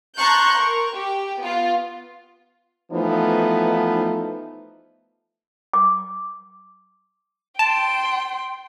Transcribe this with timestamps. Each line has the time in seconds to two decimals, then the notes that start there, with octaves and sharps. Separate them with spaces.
0.18 A5 A#5 C6 C#6 F#6 G6
0.58 A#4 C#6
0.95 G4
1.42 B3 F4
2.92 E3 F3 A3 B3 D#4
5.73 D6
7.59 G5 A5 C6